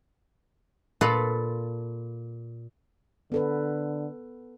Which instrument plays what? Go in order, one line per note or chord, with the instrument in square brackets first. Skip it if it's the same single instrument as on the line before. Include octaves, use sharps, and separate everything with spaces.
[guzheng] A#2 F4 A4 B4 F5 B5
[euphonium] D3 [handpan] B3 A4 B4